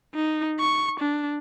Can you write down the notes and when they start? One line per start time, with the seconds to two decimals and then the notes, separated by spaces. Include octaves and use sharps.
0.15 D#4
0.60 C#6
1.00 D4